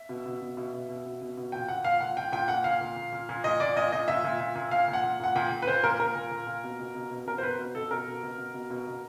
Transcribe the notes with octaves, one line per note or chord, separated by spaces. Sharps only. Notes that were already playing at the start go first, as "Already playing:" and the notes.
Already playing: E5
B2
B2
B2
B2
B2
B2
B2
B2
B2
A#2 G5
A#2 F#5
A#2 F5
A#2 F#5
A#2 G5
A#2 G5
A#2 F#5
A#2 F5
A#2
A#2
A#2
A#2
A#2 D#5
A#2 D5
A#2 D#5
A#2 D#5
A#2 E5
A#2
A#2
A#2
A#2 F5
A#2
F#5
A#2
A#2 F#5
A#2 G5
A#2
B4
A#2 C5
A#2 A#4
A#2 A#4
A#2
A#2
A#2
B2
B2
B2
B2
B2 A#4
C5
B2 B4
B2
B2 A4
B2 A#4
B2
B2
B2
B2
B2
B2